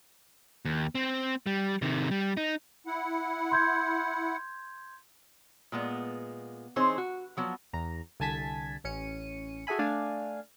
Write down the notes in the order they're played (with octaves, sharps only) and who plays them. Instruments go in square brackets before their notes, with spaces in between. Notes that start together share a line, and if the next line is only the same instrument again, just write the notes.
[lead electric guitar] D#2
C4
G3
C3 D#3
G3
D#4
[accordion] E4 F#5
[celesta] C6 G6 G#6
[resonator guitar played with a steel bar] A#2 G#3 B3
E3 C4 D#4 G#4 C5 C#5
F#4
F3 F#3 B3
[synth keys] E2 A#5
C2 D3 G#5 A5 G#6 B6
A1 C#4 C#7 D#7
F#4 G#4 A4 E5 G#5 B5
A3 D4 D5 F5 G#5